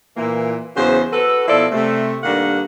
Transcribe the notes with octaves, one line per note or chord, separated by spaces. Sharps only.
A#2 E3 A#3
E2 C#3 F#3 C5
F#4 A4 B4
B2 F3 E4 A4 D5
C3 A3
G2 D#3 A#3 D4 A4 F#5